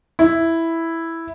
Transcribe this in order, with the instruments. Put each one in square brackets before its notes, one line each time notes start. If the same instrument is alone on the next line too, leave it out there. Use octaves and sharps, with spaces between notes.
[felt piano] E4